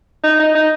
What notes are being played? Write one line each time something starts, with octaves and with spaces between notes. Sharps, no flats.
D#4
D#4
D#4